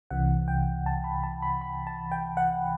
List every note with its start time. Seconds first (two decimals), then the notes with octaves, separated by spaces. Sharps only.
0.10 C2 C3 E3 F#5
0.48 G5
0.86 A5
1.04 B5
1.23 A5
1.42 B5
1.61 B5
1.87 A5
2.12 G5
2.37 F#5